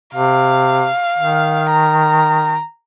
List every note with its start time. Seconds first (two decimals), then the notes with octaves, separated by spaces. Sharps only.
0.15 C3 F5
1.18 D#3
1.70 A#5